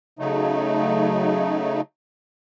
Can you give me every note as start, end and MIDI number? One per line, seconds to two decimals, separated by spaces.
0.19 1.81 49
0.19 1.81 54
0.19 1.81 57
0.19 1.81 63